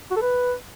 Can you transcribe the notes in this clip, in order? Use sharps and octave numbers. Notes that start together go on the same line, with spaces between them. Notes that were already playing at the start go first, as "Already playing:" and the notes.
F#4
A4
B4